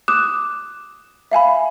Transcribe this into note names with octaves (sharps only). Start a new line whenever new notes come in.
D6 D#6 F#6 E7
E5 F5 G#5 B5